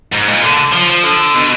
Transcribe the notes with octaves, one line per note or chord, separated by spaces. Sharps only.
G#2
A#2
D3
F3
D3
B2